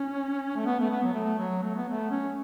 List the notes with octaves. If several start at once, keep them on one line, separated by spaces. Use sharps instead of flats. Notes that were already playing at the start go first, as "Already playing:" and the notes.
Already playing: C#4
A3
B3
A3
B3
F#3
A3
F#3
A3
B3
A3
C#4